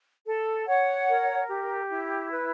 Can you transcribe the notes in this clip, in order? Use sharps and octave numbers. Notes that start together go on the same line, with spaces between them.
A4
C#5 F#5
A#4
G4
E4
B4